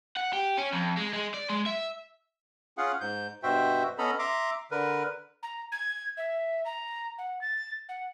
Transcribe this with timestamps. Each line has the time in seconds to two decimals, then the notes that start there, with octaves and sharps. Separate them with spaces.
0.17 F#5
0.33 G4
0.58 C#4
0.73 F2
0.97 G#3
1.13 G#3
1.34 D5
1.50 G#3
1.66 E5
2.78 C#4 F4 G#4 F5 F#5
3.01 G#2 G6
3.43 G2 B2 F#4 C5 E5 G5
3.98 B3 C#4 A4 D#5 A#5 B5
4.19 E5 A#5 C6 D6
4.71 D3 A#4 B4
5.43 A#5
5.72 G#6
6.17 E5
6.65 A#5
7.18 F#5
7.41 A6
7.89 F#5